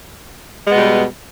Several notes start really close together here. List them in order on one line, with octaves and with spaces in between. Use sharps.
G#3 B3 B2 G3